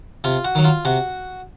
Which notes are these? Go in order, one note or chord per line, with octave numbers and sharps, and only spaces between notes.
C3 F4
F#4
D#3 F#3
F4
C3 F#4